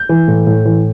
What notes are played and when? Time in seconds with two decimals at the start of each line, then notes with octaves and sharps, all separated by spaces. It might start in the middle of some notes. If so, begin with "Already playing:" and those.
Already playing: G6
0.09 E3
0.28 A2
0.47 A2
0.65 E3